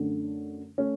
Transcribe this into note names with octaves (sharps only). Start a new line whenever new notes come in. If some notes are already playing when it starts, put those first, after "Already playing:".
Already playing: F#2 D3 A3
A3 C#4